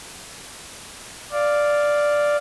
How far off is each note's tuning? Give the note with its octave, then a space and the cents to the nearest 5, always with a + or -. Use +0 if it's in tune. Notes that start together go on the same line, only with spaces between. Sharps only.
D5 +0 F5 +0